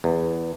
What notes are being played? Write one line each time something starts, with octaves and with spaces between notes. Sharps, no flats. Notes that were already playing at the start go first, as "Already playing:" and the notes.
E2